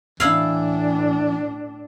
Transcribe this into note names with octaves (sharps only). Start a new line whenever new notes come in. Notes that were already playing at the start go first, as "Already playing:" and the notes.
A2 E3 D4 E4 F5